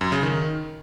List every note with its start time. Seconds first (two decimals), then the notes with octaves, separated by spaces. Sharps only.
0.01 F#2
0.12 C#3
0.23 D#3